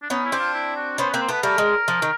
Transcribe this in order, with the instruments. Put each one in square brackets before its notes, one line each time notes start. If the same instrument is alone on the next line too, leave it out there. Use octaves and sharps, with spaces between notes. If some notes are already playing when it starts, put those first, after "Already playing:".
[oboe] D4
[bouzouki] B3 C#4 [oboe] D#4
[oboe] E4
[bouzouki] C4 D4
[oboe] F4
E4
F#4
[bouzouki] B3 C#4 [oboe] C5
[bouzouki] A#3 C4 [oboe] B4
[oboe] C5
[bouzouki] A3 B3 [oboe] B4
[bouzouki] G3 A3 [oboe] A#4
[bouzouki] G#3
F3
D#3